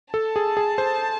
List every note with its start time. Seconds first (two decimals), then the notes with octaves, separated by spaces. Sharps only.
0.14 A4 A5
0.36 G#4
0.57 G#4
0.78 C5